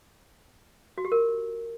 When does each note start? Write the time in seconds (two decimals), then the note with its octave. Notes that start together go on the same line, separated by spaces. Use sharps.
0.98 F#4
1.05 G4
1.12 A#4